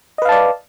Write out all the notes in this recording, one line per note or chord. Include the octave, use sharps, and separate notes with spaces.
B4 D5 D#5 F5 A5